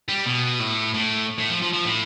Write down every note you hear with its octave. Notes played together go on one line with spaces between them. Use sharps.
G3
B2
A2
A2
A2
F3
F3
F3
A2